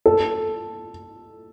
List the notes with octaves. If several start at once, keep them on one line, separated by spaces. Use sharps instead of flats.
A4